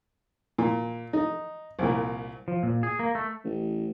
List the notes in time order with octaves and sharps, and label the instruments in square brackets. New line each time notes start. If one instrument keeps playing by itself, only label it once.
[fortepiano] A#2
D#4
C2 A#2
[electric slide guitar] F3
A#2
G#4
A#3
A3
[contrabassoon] A1